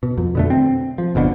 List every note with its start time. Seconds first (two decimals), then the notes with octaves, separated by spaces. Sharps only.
0.03 B2
0.18 F2
0.35 B2 D3 A3
0.50 C4
0.98 F3
1.15 G1 F2 B2 D3